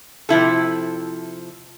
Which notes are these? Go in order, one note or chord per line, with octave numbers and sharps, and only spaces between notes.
C3 F3 E4 A4